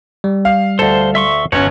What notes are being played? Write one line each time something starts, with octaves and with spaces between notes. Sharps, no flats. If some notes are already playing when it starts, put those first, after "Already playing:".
G3
F5
D2 A4 C5 A5
E5 C6 C#6
G1 C#4 F#4 C#5